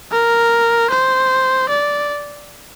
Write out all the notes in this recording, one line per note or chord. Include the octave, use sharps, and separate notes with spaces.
A#4
C5
D5